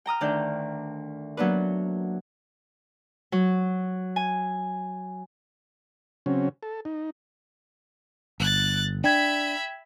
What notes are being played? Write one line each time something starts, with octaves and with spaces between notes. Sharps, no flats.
G5 A#5 D#6 F6
D2 D#3 D4 G6
F#3 A#3 B3 D4 B4
F#3
G#5
C#3 F#3 C4 C#4
A4
D#4
G1 F#6 A6
D4 E5 G5 B5 G#6